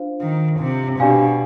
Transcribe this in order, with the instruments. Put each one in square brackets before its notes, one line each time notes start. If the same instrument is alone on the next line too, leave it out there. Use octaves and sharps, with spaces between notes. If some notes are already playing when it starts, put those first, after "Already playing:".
Already playing: [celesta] D4 F4 C5 F5
[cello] D#3
C3
[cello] B2 [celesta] D4 G4 D5 F5 G#5